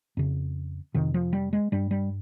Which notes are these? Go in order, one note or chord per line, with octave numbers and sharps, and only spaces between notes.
F2 C#3
F2 C3 D#3
F3
G3
G#3
G2 G3
G3